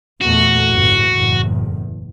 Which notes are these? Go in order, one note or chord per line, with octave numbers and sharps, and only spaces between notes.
E2 A#2 A3 F#4
G1 E2 A2
F#1 E2 A2